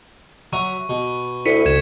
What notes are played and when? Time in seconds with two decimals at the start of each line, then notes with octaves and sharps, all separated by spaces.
0.53 F#3 E5 A#5 C#6
0.89 B2
1.46 D2 E4 B6 C#7 D#7
1.66 C#2 G#6 E7